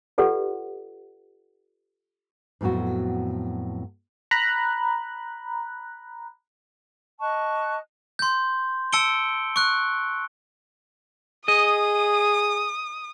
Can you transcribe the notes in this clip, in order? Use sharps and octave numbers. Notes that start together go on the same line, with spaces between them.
F4 G4 A4 B4 D5 F#5
F2 A2 F#3 B3 F#4
A#5 B5 F#6
D#5 A5 C#6 F#6
C6 G6
A5 E6 C#7 D7 G7
C#6 F#6
G#4 D#5 D#6